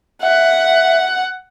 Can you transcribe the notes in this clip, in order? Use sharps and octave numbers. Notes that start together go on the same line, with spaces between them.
E5 F#5